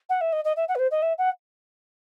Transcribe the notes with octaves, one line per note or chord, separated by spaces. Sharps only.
F#5
E5
D#5
D#5
E5
F#5
B4
C5
D#5
E5
F#5